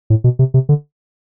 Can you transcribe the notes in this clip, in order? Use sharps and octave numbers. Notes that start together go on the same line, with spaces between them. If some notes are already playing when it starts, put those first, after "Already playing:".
A2
B2
C3
C3
D3